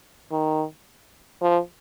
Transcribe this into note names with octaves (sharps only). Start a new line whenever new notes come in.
D#3
F3